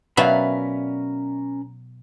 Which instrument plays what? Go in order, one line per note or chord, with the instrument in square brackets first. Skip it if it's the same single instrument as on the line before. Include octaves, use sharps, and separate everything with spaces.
[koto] B2 F#3 [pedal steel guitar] C#4 A#4 B5 [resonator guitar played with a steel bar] D5 E5 F5